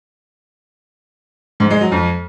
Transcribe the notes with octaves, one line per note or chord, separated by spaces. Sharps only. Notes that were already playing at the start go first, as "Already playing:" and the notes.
G#2
G#3
F#3
F2